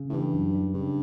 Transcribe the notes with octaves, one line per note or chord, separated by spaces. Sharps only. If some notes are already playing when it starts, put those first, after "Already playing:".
Already playing: C#3
A2
G2 E3
F#2
G3
G2 C#3